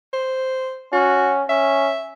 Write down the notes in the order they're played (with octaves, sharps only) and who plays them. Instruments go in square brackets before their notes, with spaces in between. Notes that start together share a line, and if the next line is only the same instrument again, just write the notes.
[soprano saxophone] C5
[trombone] C#4 [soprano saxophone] F#4
[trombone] C#4 [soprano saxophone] E5